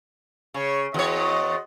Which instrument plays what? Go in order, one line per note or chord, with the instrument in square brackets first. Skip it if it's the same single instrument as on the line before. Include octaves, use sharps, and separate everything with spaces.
[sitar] C#3 [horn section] C#5
[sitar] E2 C#5 [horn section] F#4 C5 D#5